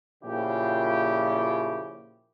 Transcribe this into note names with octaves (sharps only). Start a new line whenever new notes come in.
A#2 C#3 F3 E4 G4